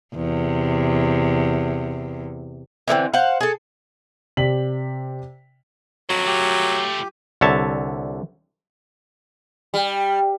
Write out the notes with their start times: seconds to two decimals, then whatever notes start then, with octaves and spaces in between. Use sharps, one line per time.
0.16 E2 C3
2.88 D3 E3 A#3 C4
3.14 C5 F5 F#5
3.40 G#4 A4
4.37 C3 D5 B6 F#7
6.10 F2 F#3
6.26 A3 F4 G4
7.41 C2 D3 C#5 E5 A5
9.74 G3